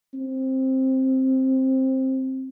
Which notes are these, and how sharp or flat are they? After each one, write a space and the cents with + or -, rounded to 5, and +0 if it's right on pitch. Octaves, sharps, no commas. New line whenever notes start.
C4 +10